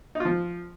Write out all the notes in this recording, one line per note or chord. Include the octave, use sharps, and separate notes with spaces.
D#4
F4
F3